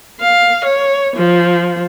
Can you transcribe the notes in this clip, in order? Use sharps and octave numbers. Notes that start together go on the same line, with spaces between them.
F5
C#5
F3